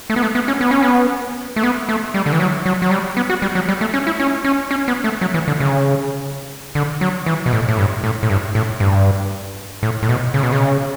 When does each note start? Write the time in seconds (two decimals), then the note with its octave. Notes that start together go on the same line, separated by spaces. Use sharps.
0.10 A3
0.16 B3
0.22 A3
0.35 B3
0.48 C#4
0.61 B3
0.71 C#4
0.82 B3
1.56 A3
1.63 B3
1.89 A3
2.14 G3
2.26 D3
2.32 E3
2.40 F#3
2.65 F#3
2.82 F#3
2.91 G3
3.17 B3
3.30 F#4
3.42 G3
3.55 F#3
3.69 G3
3.81 A3
3.94 C#4
4.07 E4
4.20 C#4
4.45 C#4
4.71 C#4
4.88 B3
5.04 A3
5.21 F#3
5.34 E3
5.48 D3
5.60 C#3
6.75 D3
7.01 F#3
7.26 E3
7.46 B2
7.53 A2
7.69 A2
7.78 G2
8.04 A2
8.23 A2
8.30 G2
8.55 A2
8.80 G2
9.83 A2
10.02 A2
10.09 B2
10.34 C#3
10.43 B2
10.52 C#3